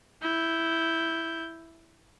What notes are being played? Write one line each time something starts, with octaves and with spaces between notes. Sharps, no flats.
E4 G6